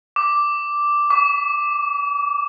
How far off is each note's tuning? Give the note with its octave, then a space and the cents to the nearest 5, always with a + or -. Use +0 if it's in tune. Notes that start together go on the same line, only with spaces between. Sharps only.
D6 +0
D6 -40